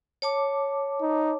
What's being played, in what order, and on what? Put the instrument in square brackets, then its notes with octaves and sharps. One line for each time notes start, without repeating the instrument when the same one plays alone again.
[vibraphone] C#5 A5 D6
[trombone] D#4